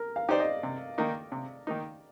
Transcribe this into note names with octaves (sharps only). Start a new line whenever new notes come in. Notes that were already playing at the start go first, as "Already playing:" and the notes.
Already playing: A#4
F5
D#4 G4 C5 D5
D#5
C3
D#3 A#3 D#4
C3
D#3 A#3 D#4